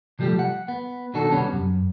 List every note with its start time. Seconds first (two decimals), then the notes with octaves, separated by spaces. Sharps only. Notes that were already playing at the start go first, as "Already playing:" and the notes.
0.19 C3 F3 G3 A3 G4
0.39 F#5
0.68 B3
1.14 B2 D#3 D4 F#4 A4
1.31 C2 G3 B3 C#4 F#4
1.52 F#2